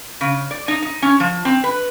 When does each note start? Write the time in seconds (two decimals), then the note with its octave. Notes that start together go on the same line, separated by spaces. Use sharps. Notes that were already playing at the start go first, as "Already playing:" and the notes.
0.21 C#3
0.51 D5
0.68 D#4
0.82 D#4
1.02 C#4
1.20 F3
1.45 C4
1.64 B4